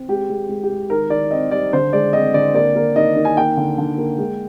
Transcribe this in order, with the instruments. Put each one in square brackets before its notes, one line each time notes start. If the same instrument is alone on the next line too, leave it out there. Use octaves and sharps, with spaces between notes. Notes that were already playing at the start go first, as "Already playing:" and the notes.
Already playing: [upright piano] C4
G#3 G4
G#3
G#3
G4
G#3
D#3 A#4
D#3 D5
C4 D#5
G3 D5
D3 C5
G#3 D5
C4 D#5
D3 D5
A#3 D5
A#3
D#3 D#5
D#3
G#5
A#3 G5
D3
D3
A#3
G#3